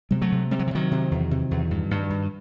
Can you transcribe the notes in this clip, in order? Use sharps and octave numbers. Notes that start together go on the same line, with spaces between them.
C3 G3
F#3 A3
C3
C3 G3
F#3
E3
C3 D#3 F#3
C3
E2
C3
E2
G2
G2
G2